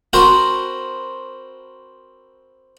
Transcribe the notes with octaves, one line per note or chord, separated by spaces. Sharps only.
C4 F#4 A#4 C5 A#5 B5